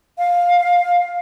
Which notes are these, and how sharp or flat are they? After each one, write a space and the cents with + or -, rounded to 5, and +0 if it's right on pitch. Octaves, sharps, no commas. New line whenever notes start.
F5 +10